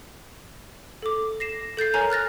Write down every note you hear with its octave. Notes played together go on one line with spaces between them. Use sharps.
A4 D6
A#6 C7 E7
A4 G6 A6 C7
A#4 C#5 G#5 A#5
F6 F#6 A6 A#6